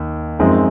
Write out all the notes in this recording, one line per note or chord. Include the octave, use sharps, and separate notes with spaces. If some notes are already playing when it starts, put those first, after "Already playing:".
Already playing: D#2
F#2 F3 G#3 C4 D#4